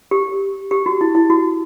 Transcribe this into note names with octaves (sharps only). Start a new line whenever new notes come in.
G4
G4
F#4
E4
E4
F#4